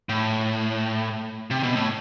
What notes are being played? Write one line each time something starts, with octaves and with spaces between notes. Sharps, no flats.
A2
C3
B2
A2